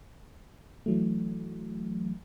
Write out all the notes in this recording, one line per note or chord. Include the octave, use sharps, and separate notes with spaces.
E3 F#3 A3